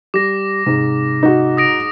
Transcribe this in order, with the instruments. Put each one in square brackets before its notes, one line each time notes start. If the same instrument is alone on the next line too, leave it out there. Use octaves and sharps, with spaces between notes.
[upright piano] G3 [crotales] D6 A#6
[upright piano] G#2 [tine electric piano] C3
[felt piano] D#4 F#4
[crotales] D#6 A#6 D7